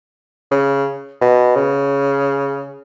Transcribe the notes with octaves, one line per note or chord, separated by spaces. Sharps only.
C#3
B2
C#3